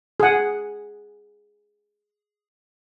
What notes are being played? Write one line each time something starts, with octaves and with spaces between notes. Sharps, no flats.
G#4 F#5